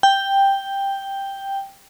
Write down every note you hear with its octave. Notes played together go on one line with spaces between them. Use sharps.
G5